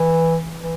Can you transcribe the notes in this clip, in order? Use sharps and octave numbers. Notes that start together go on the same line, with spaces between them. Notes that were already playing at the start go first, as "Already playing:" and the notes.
Already playing: E3
E3